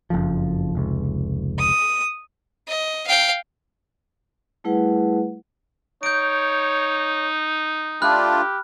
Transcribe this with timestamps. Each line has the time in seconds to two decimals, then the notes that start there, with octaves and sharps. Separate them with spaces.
0.10 F#1 F2 F3
0.75 F1 C#2
1.58 D#6
2.68 D#5
3.07 F5 G5
4.64 G3 A3 E4 G#4 B4 F#5
6.03 D#4 C#5 G6 D7
8.02 A3 D4 F4 G4 B5 F6 F#6